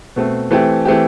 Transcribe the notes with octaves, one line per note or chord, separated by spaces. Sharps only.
B2 A3 C4
E3 A3 C4 G4
E3 A3 C4 G4